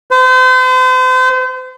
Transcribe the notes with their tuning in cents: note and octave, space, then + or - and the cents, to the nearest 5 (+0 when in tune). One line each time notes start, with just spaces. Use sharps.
C5 -40